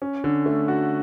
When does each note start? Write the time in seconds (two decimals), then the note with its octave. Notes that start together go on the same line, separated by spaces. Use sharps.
0.02 C#4
0.24 D3
0.46 A3
0.68 F#4